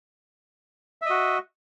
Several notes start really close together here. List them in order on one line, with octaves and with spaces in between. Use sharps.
E5 D#5 F#4